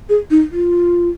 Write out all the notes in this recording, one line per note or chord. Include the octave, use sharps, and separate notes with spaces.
G#4
D#4
F4